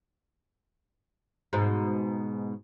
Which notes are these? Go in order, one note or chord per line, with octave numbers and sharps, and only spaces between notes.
G#2 B2